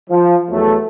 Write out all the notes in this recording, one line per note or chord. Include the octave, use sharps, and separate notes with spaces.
F3
E2 F#3 A3